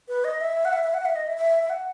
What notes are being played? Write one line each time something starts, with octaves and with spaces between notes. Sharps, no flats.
B4
D#5
E5
F#5
E5
E5
F#5
E5
D#5
E5
E5
E5
F#5